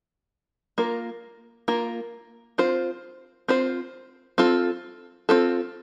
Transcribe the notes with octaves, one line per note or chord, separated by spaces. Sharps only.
A#3 F4 A#4
A#3 F4 A#4
C4 F4 C5
C4 F4 C5
C4 F4 A4
C4 F4 A4